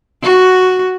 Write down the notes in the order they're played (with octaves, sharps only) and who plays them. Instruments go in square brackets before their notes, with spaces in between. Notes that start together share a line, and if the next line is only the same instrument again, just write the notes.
[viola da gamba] F#4